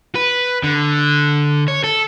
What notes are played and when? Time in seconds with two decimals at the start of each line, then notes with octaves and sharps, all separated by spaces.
0.15 B4
0.64 D3
1.68 C#5
1.84 A4